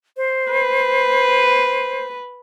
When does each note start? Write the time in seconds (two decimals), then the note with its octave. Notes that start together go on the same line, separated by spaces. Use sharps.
0.17 C5
0.51 B4